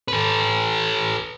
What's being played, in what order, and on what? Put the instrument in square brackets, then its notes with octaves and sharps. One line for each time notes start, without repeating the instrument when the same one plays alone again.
[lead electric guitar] A4 B4